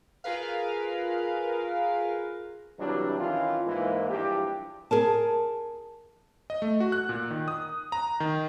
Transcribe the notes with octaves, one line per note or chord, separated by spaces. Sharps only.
F4 G#4 A#4 B4 F5
A#1 C3 E3 F#3 G3 D4
D#3 E3 C#4 F4
G#2 E3 A#3
A#1 G2 E3 G4
G#4 A#4 A5
D#5
A3
F#4
F#6
A#2
D#3
D#6
A#5
D#3